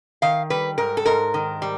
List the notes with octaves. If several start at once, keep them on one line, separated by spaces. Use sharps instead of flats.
D#3 F5
G3 B4
G#2 A#4
A4
G#2 A#4
D#3
G3